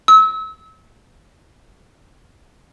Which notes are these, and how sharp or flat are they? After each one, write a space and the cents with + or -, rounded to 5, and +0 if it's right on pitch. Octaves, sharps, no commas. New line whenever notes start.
E6 -35